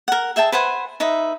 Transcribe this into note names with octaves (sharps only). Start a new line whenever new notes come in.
A#4 F#5
G#4 E5 G5 A5
B4 C5 F#5 G#5
D#4 B4 E5